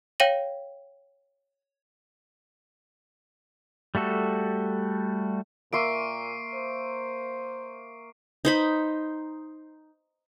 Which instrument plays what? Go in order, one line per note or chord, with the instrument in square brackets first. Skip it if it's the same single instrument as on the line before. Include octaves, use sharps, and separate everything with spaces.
[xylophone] C#5 F5 G5 A#6 D#7 F#7
[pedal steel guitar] G3 A3 F#4 A4
[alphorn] A#2 [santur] A#3 E5 C6 [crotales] C#6 C7 D7
[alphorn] C5
[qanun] D#4 C5 B5